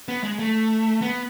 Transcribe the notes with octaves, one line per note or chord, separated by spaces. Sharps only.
B3
G#3
A3
B3